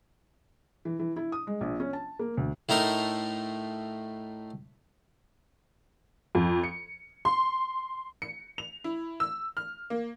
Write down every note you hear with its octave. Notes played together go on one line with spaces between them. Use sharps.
E3
E3
E4
D#6
G#3
A#1
C#4
A5
A#3
D2
A2 A3 D#4 A#4 C6
F2
C#7
C6
C#7
F7
E4
E6
F6
A#3